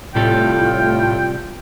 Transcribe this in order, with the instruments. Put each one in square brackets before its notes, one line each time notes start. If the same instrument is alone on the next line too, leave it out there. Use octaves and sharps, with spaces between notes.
[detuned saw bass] A2 [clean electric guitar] C3 G3 A4 [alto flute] F4 [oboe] G5